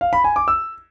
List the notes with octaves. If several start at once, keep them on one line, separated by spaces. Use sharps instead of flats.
F5
B5
G#5
D6
E6